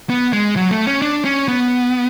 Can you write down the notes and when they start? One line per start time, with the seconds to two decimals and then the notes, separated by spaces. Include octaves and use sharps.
0.10 B3
0.33 G#3
0.56 F#3
0.71 A3
0.86 C#4
1.02 D4
1.25 C#4
1.48 B3